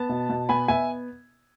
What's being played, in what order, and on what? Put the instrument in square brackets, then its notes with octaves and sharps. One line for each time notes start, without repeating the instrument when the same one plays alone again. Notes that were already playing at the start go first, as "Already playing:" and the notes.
Already playing: [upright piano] B3 A5
B2
B2
B3 G#5 B5
B3 E5 G#5